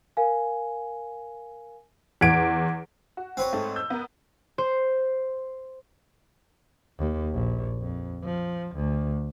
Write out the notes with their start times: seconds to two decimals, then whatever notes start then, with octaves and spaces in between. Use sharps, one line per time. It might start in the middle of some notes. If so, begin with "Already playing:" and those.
0.17 A#4 F5 G#5
2.21 E2 F#5 G#6 B6 D7
3.17 F#4
3.37 C4 B4 C#5
3.53 G#2 A3
3.76 E6 G6
3.90 B3 A#4
4.58 C5
6.99 D#2
7.33 A#1
7.81 F2
8.23 F3
8.75 D2